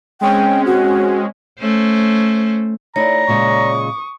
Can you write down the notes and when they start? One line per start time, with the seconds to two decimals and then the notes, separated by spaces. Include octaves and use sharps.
0.21 G#3 C4 C#4 G5
0.66 F#4
1.59 A3 C#4 C5
2.96 A3 D#4 E4 C#5 D5 A#5
3.28 A#2 C#3 G#3 C#6 D#6